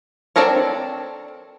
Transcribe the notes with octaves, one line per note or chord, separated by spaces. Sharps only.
C4 D4 A4 A#4 C#5